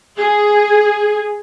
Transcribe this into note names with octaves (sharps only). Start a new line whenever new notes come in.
G#4